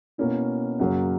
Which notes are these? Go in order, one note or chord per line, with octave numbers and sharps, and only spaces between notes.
B2 A#3 C#4 E4
F#2 C#3 F#3 A#3 C#4